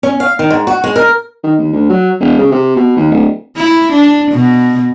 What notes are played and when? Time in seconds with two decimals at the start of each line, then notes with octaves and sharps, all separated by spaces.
0.03 C#4
0.20 F5
0.39 D#3
0.50 G#2
0.67 F#4
0.84 G#3
0.96 A#4
1.44 D#3
1.59 D#2
1.73 D2
1.90 F#3
2.20 E1
2.39 C#3
2.51 C3
2.76 B2
2.97 D#2
3.11 D1
3.57 E4
3.93 D4
4.32 B2